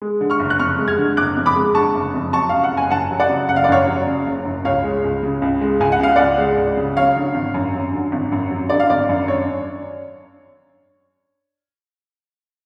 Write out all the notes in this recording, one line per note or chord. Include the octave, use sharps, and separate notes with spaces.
G#3
D3
C#6 F6
F#1
F#6
F2 C#6 F6
G#3
F6 G#6
D3
F#1 D6 F#6
F2
B5 D6
G#3
D3 A5 C#6
F#1
F2
F#3 A5 C#6
C#3 F5
F#5
F#1
G#5
F#2 F#5 A5
F#3
D5 F#5
C#3
F#1 F#5
F5
D5
F#2 C#5 F5
F#3
C#3
F#1
F#2
C#2 C#5 F5
G#3
C#2
C#3
C#2
G#3
C#2 G#5
F#5
C#3 F5
C#2 D5 F#5
G#3
C#2
C#3
F#3 C#5 F5
D3
G#1
F#2
F#3
D3
G#1
F#2
F#3
D3 D5
F5
G#1 D5
F#2
D4 C#5